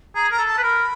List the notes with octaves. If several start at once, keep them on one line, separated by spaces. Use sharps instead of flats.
G#4 A#5
A#4 A#5
A4
A5
B4
A#4 B5